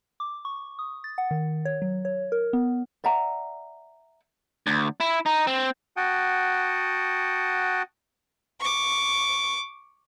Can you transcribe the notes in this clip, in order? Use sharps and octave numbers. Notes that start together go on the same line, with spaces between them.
D6
C#6
D#6
A6
F#5
D#3
C#5
F#3
C#5
A#4
B3
D5 E5 F#5 A#5
D2
E4
D#4
C4
F#4 F#5 G5 A5 D#6
C#6 D6